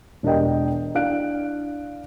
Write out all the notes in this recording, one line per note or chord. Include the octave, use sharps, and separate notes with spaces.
E1 D4 G4 A#4 D#5 G5
D4 E4 F5 F#6 D7